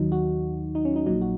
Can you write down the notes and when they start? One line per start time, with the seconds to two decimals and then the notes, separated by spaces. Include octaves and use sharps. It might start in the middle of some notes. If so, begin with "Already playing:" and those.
Already playing: D#2 D#3 F#3 D#4
0.12 F#4
0.75 D#4
0.85 C#4
0.96 D#4
1.06 A#1 A#2 F#3 D#4
1.21 F#4